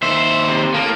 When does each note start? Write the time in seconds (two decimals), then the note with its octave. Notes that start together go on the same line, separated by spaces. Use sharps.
0.03 D#2 C5 E5
0.49 C3
0.74 A2 A#3